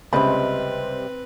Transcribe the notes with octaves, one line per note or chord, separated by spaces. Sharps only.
C#2 C3 G3 C4 B4 D#5 B5